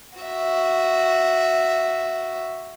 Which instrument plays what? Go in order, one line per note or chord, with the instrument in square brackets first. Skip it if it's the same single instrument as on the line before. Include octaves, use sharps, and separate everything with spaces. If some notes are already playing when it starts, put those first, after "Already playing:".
[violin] F#4 E5